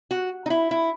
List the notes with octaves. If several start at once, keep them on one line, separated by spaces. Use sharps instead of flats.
F#4
D#4
E4
E4